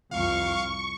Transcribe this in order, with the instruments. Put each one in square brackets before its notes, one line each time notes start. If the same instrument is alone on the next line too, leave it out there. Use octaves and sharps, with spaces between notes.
[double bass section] C2 F2 [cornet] F5 [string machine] C#6